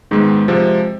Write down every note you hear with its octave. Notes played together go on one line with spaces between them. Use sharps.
G#2 D#3 G#3 B3
C3 F3 G#3